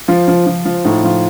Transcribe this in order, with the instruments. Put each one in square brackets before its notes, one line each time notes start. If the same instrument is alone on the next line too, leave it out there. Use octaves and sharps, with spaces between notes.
[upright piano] F3 F4
F3
F3
F3
A2 D#4
F3 F4